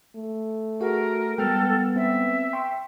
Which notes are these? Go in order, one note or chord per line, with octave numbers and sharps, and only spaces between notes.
A3
F#4 G#4 A#4 F#5
G3 G#3 B3 A4 G5 F6
C4 E5
G5 C6 C#6